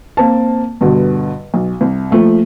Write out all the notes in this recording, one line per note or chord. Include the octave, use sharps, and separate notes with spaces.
A#3 C4 A5
G2 B2 D3
B1
C2
F3 A3 A#3